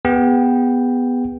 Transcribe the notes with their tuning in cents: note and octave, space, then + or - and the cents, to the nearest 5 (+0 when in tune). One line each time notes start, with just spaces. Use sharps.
B3 +0 G#4 -40 G5 +0